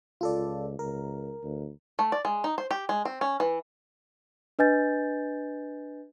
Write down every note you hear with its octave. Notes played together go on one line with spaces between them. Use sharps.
C#2 F4 A4 D5
C#2 A#4
D2
A3
D5
G#3
D#4
C5
G4
G#3
C4
C#4
E3
D4 B4 D#5 G#5 G6 A6